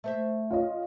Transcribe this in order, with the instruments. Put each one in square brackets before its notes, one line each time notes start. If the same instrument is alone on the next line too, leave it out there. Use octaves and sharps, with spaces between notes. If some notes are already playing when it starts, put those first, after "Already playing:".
[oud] A3 C5 E5
[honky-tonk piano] F4 C#5 D#5